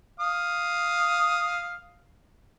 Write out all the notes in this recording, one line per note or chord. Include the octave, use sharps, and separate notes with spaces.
F5 D#6